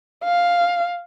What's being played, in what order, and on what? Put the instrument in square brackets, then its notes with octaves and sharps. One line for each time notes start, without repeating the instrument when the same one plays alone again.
[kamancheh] F5